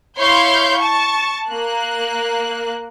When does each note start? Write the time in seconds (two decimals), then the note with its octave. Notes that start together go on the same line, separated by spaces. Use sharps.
0.18 E4 C#5 F5 C6 G6
0.77 A5 C#6
1.48 A#3 F#6